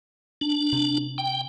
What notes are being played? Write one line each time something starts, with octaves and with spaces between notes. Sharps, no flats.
D4
C3
G5